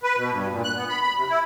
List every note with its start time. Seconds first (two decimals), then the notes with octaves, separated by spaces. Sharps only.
0.03 B4
0.17 B2
0.32 G2
0.51 A#2
0.64 F#6
0.76 B3
0.89 B5
1.02 B5
1.17 C3
1.29 E4